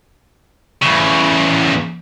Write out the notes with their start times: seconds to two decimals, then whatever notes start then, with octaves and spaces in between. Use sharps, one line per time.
0.82 E2 C#3